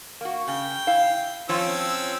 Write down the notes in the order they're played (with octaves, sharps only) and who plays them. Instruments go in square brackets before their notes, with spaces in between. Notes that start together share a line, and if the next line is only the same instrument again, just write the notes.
[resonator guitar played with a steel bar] A#3 F#4
[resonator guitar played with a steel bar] C#3 [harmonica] G5
[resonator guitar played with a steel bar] E4 F5
[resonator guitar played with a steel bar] F3 F4 C#5 [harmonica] C4 C#4 E6